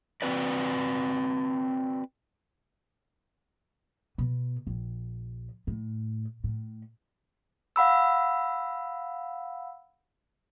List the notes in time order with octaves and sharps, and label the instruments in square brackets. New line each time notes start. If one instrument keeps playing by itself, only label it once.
[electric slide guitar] C4 F#4 B4 D5
[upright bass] B2
A#1
A2
A2
[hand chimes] F5 F#5 B5 E6